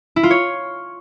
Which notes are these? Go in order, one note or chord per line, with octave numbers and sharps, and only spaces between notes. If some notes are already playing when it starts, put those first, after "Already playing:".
E4
F4
C#5